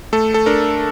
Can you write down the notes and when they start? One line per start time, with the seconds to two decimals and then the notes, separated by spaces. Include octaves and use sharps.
0.13 A3 A4
0.34 A4
0.46 D4 A#4